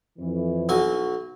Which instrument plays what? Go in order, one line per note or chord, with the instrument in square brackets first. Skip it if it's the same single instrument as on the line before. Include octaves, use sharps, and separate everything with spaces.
[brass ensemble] F2 E3
[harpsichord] B1 F#3 G#5